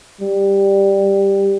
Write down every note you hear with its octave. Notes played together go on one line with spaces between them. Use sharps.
G3